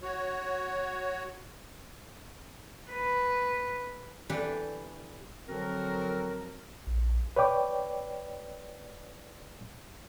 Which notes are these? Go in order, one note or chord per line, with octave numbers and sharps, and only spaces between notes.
F#4 C#5
B4
E3 D4 G4 A4 B4
D3 F3 F#3 C4 F#4 A#4
A#1
B4 C#5 D5 G5 D6